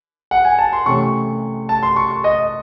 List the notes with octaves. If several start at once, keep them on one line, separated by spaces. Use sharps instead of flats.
F#5
G#5
A5
C6
C3 E3 A3 C#4 C#6
A5
C6
C#6
D#5